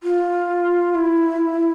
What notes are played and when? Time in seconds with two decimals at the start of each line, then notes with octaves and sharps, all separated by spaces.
0.03 F4
0.95 E4